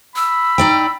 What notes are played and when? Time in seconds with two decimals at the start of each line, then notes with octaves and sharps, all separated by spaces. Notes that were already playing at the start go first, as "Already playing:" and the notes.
0.16 B5 E6
0.58 D#4 D5 G5